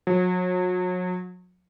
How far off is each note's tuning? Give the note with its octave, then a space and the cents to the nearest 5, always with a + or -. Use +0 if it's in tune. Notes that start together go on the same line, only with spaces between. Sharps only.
F#3 -35